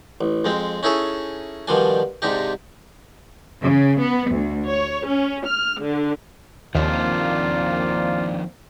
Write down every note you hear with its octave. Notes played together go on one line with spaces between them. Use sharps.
A1
F2 G#3 C4
C#4 D#4 E4 G#4 A4 C#5
B2 D#3 F3 G3 D4 G#5
G#2 C3 D4 D#4 G4
C#3
B3
D2
C#5
C#4
F6
D3
D#2 D#3 F3 A#3 C4 D4 F4 D5